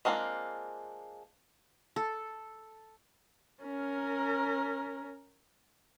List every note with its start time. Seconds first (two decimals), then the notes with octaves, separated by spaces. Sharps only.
0.05 G#3 A#3 C4 D4 F4
1.96 A4
3.63 C#4 A#4